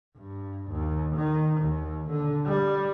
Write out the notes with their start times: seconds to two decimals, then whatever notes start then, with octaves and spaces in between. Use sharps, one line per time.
0.17 G2
0.70 D#2
1.16 D#3
1.61 D#2
2.10 D3
2.46 G3